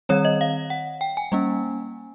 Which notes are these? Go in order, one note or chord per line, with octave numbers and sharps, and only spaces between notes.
D#3 G3 C4 C#5
D#5
F5
F#5
G5
G#5
G3 A#3 C#4